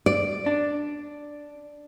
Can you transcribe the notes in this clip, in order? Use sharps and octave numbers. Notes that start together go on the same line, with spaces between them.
D5
D4